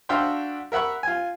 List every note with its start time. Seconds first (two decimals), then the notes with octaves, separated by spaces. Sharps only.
0.09 D4 F#4 E5 F5 G5 C6
0.72 A#4 E5 F#5 B5 C#6
1.03 F4 G#5